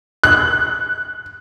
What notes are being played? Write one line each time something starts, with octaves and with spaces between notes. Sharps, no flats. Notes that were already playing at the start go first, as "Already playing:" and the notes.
F#6